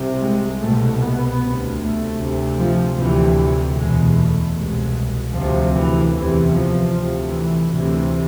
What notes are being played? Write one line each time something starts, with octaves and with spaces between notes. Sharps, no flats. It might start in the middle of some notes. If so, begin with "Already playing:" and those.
Already playing: C2 C3
G#3
C2 B2 A3
B3
D2 C3
A3
D2 C3
F3
D2 C3 E3
E2 B2 G#3
A3
C2 B2 G#3
D2 C3 F3
E3
E2 C3 E3
F3
D2 C3
E3
D2 C3 E3